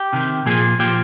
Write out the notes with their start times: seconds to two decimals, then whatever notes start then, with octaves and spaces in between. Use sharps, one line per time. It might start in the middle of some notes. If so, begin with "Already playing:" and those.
Already playing: G4
0.13 C3 D#3
0.46 A#2 F3 G#4
0.79 A#2 F3 G4